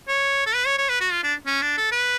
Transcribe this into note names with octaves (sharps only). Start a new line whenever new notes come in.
C#5
A4
B4
C#5
C#5
B4
F#4
F4
D4
C#4
D4
A4
B4